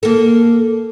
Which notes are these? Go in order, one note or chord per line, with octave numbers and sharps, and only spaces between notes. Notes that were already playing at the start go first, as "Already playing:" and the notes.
A#3 A4